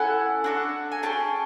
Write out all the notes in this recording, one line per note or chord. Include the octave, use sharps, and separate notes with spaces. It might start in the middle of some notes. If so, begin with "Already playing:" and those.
Already playing: C#4 E4 A4 F#5 G#5
D4 F#4 A4
G#5
C#4 E4 G#4 G5 A5